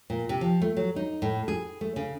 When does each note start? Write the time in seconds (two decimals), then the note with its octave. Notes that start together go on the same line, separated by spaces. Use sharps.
0.10 A#2
0.29 C3
0.41 F3
0.62 A3
0.77 F#3
0.96 D#4
1.22 A2
1.48 G#4
1.81 A3
1.96 C#3